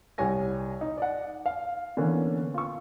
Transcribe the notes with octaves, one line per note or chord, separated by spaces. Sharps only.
C2 G4 C#5 G#5 A#6
D#4
D5 F#5
F5
D3 E3 A#3 B3 C#4
F4 C#6